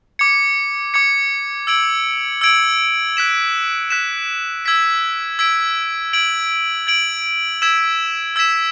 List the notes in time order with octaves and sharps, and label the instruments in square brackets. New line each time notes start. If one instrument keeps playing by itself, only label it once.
[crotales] D6 G#6 C#7
D6 G#6 C#7
E6 G#6 D7 F#7
E6 G#6 D7 F#7
F#6 B6 E7
F#6 B6 E7
E6 G#6 B6 D7
E6 G#6 B6 D7
G#6 D7 F#7
G#6 D7 F#7
E6 G#6 B6 E7
E6 G#6 B6 E7